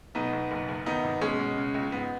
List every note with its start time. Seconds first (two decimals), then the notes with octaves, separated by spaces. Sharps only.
0.15 B1 B3 D#4
0.33 B1
0.51 F#1
0.68 F#1
0.86 D#3 B3 D#4
1.04 G#1
1.21 B2 G#3 C#4
1.39 B2
1.57 C#3
1.74 C#2
1.92 G#2 B3